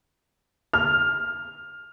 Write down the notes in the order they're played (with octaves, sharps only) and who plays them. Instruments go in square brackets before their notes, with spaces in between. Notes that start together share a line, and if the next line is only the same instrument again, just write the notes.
[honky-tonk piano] F6